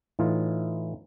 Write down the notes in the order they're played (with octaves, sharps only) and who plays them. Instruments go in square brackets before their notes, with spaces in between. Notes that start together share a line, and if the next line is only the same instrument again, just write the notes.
[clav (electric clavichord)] A2 E3 D#4 F4